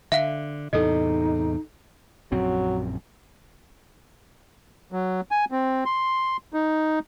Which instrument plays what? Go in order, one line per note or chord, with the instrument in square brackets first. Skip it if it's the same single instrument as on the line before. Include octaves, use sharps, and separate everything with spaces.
[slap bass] D3 [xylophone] E5 F5
[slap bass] E2 A2 C3 [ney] D#4 [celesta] A4 D#5
[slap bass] A#1 F#2 C4 [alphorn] F#3
[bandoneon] F#3
G#5
C4
C6
D#4